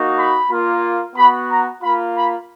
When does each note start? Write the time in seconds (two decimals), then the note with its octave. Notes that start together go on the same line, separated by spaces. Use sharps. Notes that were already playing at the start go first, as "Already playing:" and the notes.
Already playing: A#3 D#4 F#4
0.17 B5
0.50 A#3 F4
1.16 B3 F#4 B5
1.49 A#5
1.82 A#3 F4 B5
2.15 B5